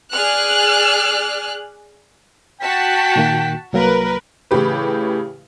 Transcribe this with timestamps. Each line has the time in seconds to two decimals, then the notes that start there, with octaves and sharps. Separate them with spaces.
0.13 G#4 D5 F6 F#6
2.62 F#4 G5 A5 B6
3.16 A#2 D#3 A#3
3.73 C2 F#3 A#3 A#4 B4
4.51 A2 C#3 E3 G4 B4